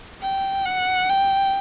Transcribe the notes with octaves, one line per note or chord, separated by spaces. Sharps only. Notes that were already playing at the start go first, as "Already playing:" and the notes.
G5
F#5
G5